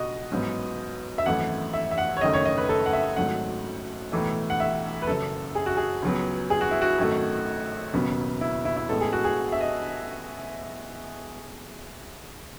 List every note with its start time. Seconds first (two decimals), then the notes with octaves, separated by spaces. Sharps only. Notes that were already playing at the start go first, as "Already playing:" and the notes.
Already playing: C#2 B2 F#4 D#5
0.31 A1 G#2 F#3 B3
1.18 E5
1.26 G#1 F#2 E3 A3 F#5
1.73 E5
1.91 E5
1.98 F#5
2.17 C#5
2.21 F#1 F#2 D#3 A3 D#5
2.33 C#5
2.45 D#5
2.58 B4
2.69 A4
2.86 F#5
2.93 E5
3.16 G#1 G#2 F#3 A3 F#5
4.12 B1 A2 E3 A3
4.50 F#5
4.60 E5
5.02 B4
5.07 F#1 F#2 C#3 A4
5.55 G#4
5.66 F#4
5.77 G#4
6.03 C#2 C#3 F#3 B3
6.50 G#4
6.61 F#4
6.71 E4
6.82 F#4
6.98 G#1 F#2 D#3 A3
7.94 E1 D#2 C#3 F#3 B3
8.41 E4
8.65 E4
8.77 E4
8.89 A1 A2 G#3 B3 A4
9.01 G#4
9.13 F#4
9.24 G#4
9.52 E5
9.61 D#5